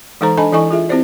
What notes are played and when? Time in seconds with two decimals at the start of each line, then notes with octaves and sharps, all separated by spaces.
0.21 E3 G#3 D#4 A4 C5 A#5
0.37 D4 A4 D#5 G#5 A5 B5
0.52 E3 E4 A4 D#5 G#5 C#6
0.71 F4 G#4 E5
0.89 C4 E4 G4 C5 D5